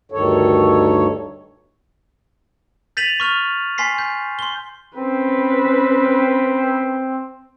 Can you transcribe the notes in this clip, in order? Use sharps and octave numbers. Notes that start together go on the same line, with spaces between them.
D2 G2 D#3 A4 C#5
G6 A6 B6 D#7 F7 F#7
C#6 F6 F7
G#5 C6 B6 C7
G6
C6 G7
C4 C#4 B4